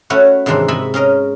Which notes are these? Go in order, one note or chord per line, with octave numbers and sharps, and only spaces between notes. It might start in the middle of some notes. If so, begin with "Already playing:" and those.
A3 C#4 E4 F#4 B4 C#5
G#2 C3 D#3 E3 D4 C5
G#2 C3 D#5 E5 G#5 B5
C#4 G#4 A#4 D#5